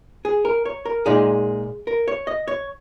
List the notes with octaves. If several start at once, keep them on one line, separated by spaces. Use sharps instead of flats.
G#4
A#4
C#5
A#4
A#2 G#3 D#4 G#4
A#4
C#5
D#5
C#5